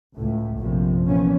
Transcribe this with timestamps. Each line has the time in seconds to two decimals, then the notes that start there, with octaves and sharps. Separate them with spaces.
0.17 C#2 A2 A3
0.58 A#1 F#2 C3 F3
1.06 A#2 E3 F3 B3 C#4